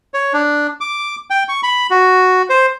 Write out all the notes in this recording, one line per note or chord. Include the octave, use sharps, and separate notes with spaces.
C#5
D4
D6
G5
C#6
B5
F#4
C5